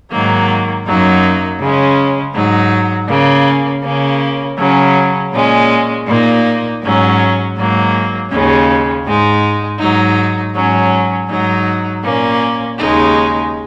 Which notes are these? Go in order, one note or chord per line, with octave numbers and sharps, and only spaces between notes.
G#2 D#3 F#3 A#3
F#2 F#3 A#3 D#4
C#3 G#3 C#4
G#2 F#3 D#4
C#3 A#3 C#4
C#3 A#3 C#4
C#3 F#3 C#4
A#2 G#3 C#4
A#2 A#3 D#4
G#2 F#3 C#4
G#2 F#3 A#3
D#2 C#3 G#3 C#4
G#2 G#3 D#4
G#2 F#3 D#4
G#2 F#3 C#4
G#2 F#3 D#4
A#2 A#3 C#4
D#2 C#3 G#3 D#4